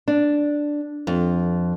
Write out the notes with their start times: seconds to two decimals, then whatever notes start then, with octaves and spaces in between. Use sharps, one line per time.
0.08 D4
1.07 F2